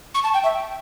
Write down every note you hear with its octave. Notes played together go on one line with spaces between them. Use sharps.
C#6
A5
G5
E5